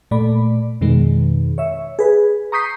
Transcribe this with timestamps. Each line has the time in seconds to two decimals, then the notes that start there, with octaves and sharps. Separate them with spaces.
0.11 A#2 A3 D5 B5
0.81 F2 B2 D#3 G#3 B3
1.58 C#5 E5
1.99 G#4 B4
2.52 A#5 C#6 D#6 G6 B6 C7